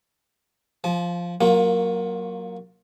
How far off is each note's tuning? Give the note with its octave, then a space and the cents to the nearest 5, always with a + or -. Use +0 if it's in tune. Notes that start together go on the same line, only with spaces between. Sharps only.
F3 +0 A5 -45
F#3 +0 A#3 +0 F4 +25